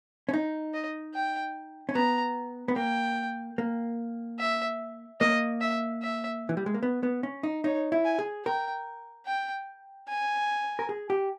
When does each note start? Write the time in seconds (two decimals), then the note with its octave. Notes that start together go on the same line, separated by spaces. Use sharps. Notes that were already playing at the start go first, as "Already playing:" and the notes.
0.29 C#4
0.33 D#4
0.74 D#5
1.14 G5
1.89 C#4
1.95 B3 A#5
2.68 B3
2.76 A#3 G5
3.58 A#3
4.39 E5
5.21 A#3 D#5
5.61 E5
6.02 E5
6.49 E3
6.57 G3
6.66 G#3
6.74 A#3
6.83 B3
7.03 B3
7.23 C#4
7.43 D#4
7.64 D#4 C#5
7.92 E4
8.05 G#5
8.19 G#4
8.45 A#4 G5
9.26 G5
10.09 G#5
10.79 A#4
10.89 G#4
11.10 G4